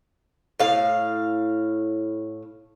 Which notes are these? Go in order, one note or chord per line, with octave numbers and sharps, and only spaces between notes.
A2 F5